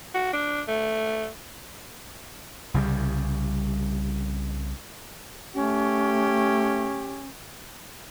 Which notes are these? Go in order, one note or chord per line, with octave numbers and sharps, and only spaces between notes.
F#4
D4
A3
C2 C#3 F#3 G3
A3 C#4 G4